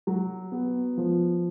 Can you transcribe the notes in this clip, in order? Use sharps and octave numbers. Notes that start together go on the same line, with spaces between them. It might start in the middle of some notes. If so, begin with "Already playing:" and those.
F#3
B3
F3